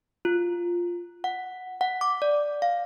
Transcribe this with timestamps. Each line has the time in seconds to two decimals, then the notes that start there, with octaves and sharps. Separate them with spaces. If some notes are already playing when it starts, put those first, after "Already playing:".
0.25 F4
1.24 F#5
1.81 F#5
2.01 D6
2.22 D5
2.62 F5